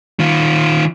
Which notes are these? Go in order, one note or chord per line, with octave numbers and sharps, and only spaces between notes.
D#3 F4